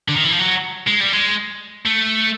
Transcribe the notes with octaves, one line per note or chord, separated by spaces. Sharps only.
D3
D#3
E3
F3
F#3
G#3
G3
G#3
A3